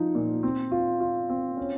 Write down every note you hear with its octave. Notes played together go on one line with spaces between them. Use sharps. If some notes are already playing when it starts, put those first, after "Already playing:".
Already playing: F3 D#4
A#2
C4
F4
F4
C4
C#4